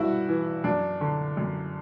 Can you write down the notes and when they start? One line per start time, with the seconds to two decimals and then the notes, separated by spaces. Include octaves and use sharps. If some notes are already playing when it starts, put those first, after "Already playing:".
Already playing: G2 E4 F#4
0.28 E3
0.64 F#2 D4
1.01 D3
1.37 F#2